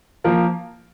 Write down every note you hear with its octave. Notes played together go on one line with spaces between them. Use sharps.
F3 A#3 F4 A#4